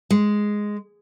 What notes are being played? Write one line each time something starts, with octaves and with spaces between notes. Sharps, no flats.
G#3